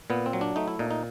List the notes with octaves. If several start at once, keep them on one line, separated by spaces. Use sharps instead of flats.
A#2 B3
C4
F#3
D4
A3 D#4
E4
A#2 D#4
D#4